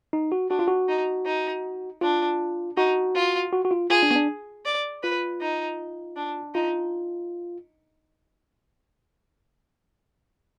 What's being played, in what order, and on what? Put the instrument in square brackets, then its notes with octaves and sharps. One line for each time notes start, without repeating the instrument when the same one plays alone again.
[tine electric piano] D#4
F#4
[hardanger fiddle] D4 [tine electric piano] F#4
[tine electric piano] F4
F#4
[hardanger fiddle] D#4
D#4
[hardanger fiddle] D4 [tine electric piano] F4
[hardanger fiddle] D#4 [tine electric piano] F#4
[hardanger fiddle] F4
[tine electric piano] F#4
F#4
F4
[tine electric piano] F4 [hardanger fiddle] G#4
[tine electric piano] D4
B3
D4
[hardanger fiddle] D5
[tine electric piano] F4 [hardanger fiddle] B4
[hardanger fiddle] D#4
D4
[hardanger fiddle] D#4 [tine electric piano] F4